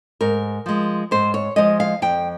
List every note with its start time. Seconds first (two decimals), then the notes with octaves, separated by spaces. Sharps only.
0.21 G#2 A#4
0.66 F3 G#3
1.11 G#2 C5
1.34 C#5
1.56 F3 G#3 D#5
1.80 F5
2.02 F2 G5